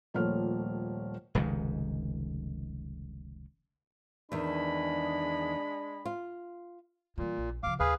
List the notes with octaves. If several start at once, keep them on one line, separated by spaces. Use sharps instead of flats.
D#1 F3 A3 A#3 C#5 F6
F1 C#2 G#2 D#3
E2 D#3 G#3 D4 G#4 B5
F4
A#2 E3 G3
A#1
C#3 F3 F5 D6
D#2 G#4 B4 F5